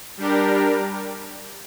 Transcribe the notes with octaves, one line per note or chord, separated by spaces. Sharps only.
G3 D4 G4 A#4